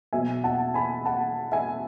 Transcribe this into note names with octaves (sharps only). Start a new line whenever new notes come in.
B2 F#3 E5 G#5
F#5 A5
G#5 B5
F#5 A5
E5 G#5